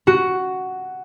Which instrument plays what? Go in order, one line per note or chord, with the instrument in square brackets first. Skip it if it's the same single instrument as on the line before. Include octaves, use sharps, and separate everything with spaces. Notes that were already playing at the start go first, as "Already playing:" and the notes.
[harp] F#4